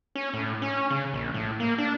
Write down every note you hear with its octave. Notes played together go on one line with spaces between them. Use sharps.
C#4
A2
C#4
C#3
A#1
A2
A#3
D4